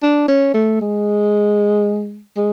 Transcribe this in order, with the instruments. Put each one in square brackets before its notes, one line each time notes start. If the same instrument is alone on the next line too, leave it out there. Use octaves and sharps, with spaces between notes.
[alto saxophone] D4
C#4
A3
G#3
G#3